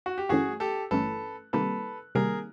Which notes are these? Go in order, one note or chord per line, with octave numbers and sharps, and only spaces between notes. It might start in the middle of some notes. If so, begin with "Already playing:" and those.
F#4
G4
G1 G2 E3 A3 C#4 F#4 G#4
G4 A4
G1 G2 E3 A3 C#4 A4 B4
C3 D#3 G3 A#3 A4 B4
C3 D#3 G3 A#3 G#4 A#4